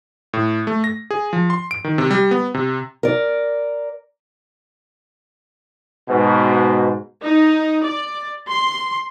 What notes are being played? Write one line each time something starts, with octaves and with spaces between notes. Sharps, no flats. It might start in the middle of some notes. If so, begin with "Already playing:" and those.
A2
A3
A#6
G#4
F3
C6
D7
D#3
C3
G3
B3
C3
A#4 D5
G#2 B2
D#4
D5
C6